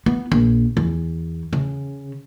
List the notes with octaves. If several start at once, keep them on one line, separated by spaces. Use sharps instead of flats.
B3
A#1
E2
C#3